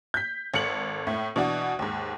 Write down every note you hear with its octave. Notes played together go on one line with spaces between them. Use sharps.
G6 B6
G#1 A4 C#7 F#7
A2 A3
B2 E3 D4 F#4
D#2 G#2